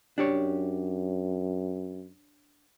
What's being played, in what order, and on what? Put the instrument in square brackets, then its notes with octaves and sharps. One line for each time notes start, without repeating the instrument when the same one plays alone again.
[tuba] F#2 [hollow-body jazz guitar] D4 G4 C#5